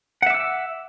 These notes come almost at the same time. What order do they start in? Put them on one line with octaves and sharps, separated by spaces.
F#5 E5 D6 E6